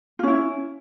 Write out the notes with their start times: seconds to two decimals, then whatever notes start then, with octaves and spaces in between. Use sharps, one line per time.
0.19 F4
0.23 C#4
0.27 E4